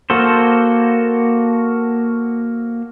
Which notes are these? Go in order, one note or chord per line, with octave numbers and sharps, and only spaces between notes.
A#3 F#4 A4 C5